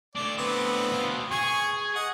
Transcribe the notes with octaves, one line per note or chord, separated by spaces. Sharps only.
A2 D4 D5
B3 C4
B2 F4
G#4 G#5 C#6
D#5 F#5